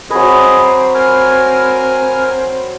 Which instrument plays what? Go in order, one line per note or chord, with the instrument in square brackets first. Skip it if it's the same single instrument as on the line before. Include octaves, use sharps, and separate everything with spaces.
[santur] F#3 B4 [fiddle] C4 [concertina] G#4 D#5
[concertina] A#4 G#5 F6